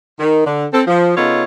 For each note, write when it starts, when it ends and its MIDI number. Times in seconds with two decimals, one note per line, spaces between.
0.19 0.42 51
0.45 0.65 50
0.73 0.82 60
0.73 0.82 69
0.87 1.15 53
1.16 1.44 49
1.16 1.44 59
1.16 1.44 63
1.16 1.44 65
1.16 1.44 69
1.16 1.44 73